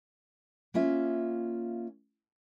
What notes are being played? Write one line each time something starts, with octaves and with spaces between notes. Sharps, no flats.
A#3 C#4 F4 E5